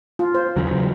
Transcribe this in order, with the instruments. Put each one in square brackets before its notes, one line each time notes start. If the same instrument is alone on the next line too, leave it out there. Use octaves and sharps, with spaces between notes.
[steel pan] F4
C5
[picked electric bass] E2 C#3 F#3